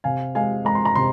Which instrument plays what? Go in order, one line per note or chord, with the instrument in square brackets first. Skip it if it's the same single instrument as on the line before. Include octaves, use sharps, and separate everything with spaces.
[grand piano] C3 F5 G#5
G#3 F5 G#5
G#3 A#5
C6
A#5
C3 C6